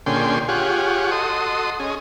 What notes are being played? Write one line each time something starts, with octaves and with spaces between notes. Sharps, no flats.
A#2 D3 C#4 G#4 G5 C6
F4 G4 G#4 C#5 F#5
F#4 A4 D#5 C6 D#6
C#4 G#4 D#5